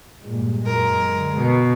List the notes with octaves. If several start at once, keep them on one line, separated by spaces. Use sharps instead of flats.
G2 A#2 G#3
F#2 G#3 A#4
D3
B2